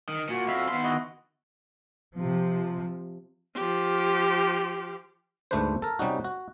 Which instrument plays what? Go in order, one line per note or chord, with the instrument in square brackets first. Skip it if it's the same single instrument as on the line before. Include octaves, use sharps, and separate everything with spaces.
[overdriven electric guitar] D#3
[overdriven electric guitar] A#2 [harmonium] F#4
[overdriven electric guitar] F2 [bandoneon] E5 F5 B5
[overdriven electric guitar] D#3 C6 [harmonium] B3
[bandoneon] E4 F#4 D#5
[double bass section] C3 F3
[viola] F3 G4
[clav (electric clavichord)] D2 G#2 A3 D4 B4 C5
A4 A#4
C3 G3 C#4 D#4 F#4
F#4